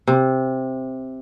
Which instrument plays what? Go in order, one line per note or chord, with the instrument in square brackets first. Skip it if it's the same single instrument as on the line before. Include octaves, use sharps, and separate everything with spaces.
[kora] C3